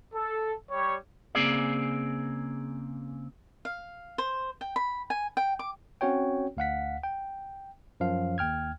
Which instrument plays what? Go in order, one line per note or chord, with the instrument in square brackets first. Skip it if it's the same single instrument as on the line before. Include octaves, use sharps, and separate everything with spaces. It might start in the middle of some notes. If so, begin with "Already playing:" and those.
[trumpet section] A4
G3 C#5
[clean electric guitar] C#3 A#3 C4 G#4 D5
[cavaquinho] F5
C5
G5
B5
G#5
G5
D6
[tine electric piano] C4 C#4 F#4 C#5 G5
D2 F5 F#5 B6
G5
F#2 F3 F5
D#2 G5 F6 G#6